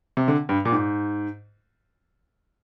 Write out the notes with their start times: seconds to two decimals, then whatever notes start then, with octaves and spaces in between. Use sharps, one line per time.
0.17 C3
0.28 D3
0.49 G2
0.65 A#2
0.72 G#2